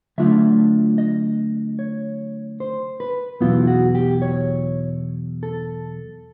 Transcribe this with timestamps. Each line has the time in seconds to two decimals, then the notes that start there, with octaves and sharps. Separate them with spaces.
0.18 D3 F#3 A3 D4 F4 E5
0.98 D#5
1.79 C#5
2.60 C5
3.00 B4
3.41 E2 B2 F#3 B3 E4 F4
3.67 F#4
3.95 G4
4.22 C#5
5.43 A4